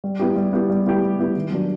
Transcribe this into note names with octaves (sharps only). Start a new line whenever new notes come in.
G3
B3 E4 G4
G3
B3 E4 G4
G3
B3 E4 G4
G3
B3 E4 G4
D#3
F#3 A#3 D4